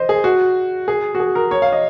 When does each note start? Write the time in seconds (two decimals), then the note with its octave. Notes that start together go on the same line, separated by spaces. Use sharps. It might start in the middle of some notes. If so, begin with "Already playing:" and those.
Already playing: C5 D#5
0.09 G#4
0.24 F#4
0.88 G#4
1.15 F#4
1.20 G#4
1.35 A#4
1.51 C#5
1.62 F5
1.73 D#5